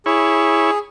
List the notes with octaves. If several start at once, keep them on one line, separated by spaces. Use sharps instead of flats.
E4 G#4 C#5